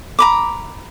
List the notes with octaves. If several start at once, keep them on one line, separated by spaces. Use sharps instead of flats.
A#5 B5 D6